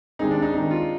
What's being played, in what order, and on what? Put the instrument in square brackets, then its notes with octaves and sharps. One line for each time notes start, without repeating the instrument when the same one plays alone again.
[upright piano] D#3 G#3 C4 G4 [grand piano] D#4
[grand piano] D4
D#4
[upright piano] D#3 G#3 C4 G4 [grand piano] D#4
[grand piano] F4